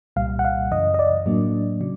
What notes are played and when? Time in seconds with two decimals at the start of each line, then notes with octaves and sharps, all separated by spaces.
0.16 C2 A#2 G3 F5
0.39 F#5
0.45 F5
0.71 F#2 C#3 E3 D#5
0.94 D#5
0.99 D5
1.26 A2 F#3 A#3 D4
1.81 C#3 F#3